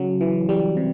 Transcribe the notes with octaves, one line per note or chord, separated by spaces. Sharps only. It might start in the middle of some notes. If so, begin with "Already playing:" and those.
Already playing: C#3 F#3
E3
G3
C3